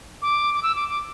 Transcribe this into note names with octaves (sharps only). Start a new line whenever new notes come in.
D6
D6
E6
D6
D6